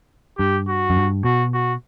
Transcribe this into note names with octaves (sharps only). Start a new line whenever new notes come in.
G2 G4
F#4
F#2
G2
B2 F#4
F#4